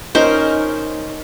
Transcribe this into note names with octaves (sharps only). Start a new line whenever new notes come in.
C#4 D#4 A#4 C5